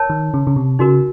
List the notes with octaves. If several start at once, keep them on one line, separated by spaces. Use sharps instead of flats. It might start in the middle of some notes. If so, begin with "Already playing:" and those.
Already playing: A#4 C#5 A5
D#3
C#3
C#3
C3
C#3 D#4 F#4 A#4